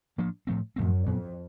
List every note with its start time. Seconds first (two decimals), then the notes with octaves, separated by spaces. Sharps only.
0.18 A2 F3 A#3 D4
0.47 A2 F3 A3 C4
0.76 F#2 A2 F3 A3 C4
1.06 F2 A#2 F#3 B3